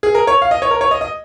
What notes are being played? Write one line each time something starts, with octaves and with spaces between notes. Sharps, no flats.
G#4
A#4
C#5
F5
D#5
C#5
A#4
C#5
D#5
D#5